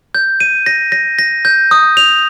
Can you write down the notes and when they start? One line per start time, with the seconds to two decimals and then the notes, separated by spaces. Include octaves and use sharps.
0.15 G6
0.40 D#7
0.66 A#6
0.92 A#6
1.19 A#6
1.45 G6
1.71 D#6
1.97 F7